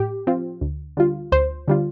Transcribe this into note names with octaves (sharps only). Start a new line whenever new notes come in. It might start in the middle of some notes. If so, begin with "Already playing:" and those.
Already playing: A2 G4
F3 C4 F4
D2
D3 G3 F4
D2 C5
D3 G3 F4